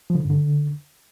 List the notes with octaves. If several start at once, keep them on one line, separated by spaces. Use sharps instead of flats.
F3
D3
C#3
G2
D3